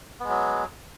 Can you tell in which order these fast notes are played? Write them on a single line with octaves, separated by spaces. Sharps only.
B3 G#3 F#3